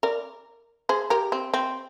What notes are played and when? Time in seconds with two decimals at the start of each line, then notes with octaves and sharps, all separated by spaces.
0.03 A#4 D5
0.89 G#4 C5
1.10 G4 A#4
1.32 C4
1.54 C4